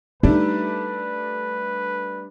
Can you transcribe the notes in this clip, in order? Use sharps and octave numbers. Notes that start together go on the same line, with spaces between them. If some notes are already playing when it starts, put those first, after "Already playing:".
G3 A3 D4 D#4 B4